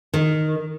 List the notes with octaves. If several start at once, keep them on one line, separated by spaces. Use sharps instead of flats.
D#3